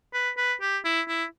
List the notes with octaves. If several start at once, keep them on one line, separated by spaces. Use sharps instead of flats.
B4
B4
G4
E4
E4